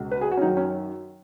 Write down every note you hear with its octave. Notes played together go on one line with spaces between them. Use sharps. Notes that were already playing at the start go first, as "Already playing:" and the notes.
Already playing: C#2 B2
B4
G#4
F#4
C#4
F#2 D#3 D#4
C#4